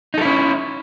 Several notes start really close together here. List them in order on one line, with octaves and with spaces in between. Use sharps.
D#4 A4 E4 C#4